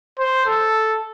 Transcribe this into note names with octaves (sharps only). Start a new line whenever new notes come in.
C5
A4